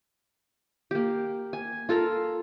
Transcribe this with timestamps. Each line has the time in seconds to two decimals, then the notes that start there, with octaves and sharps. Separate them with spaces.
0.91 A#3 G4
1.53 G#5
1.89 F4 A4 A#4 F5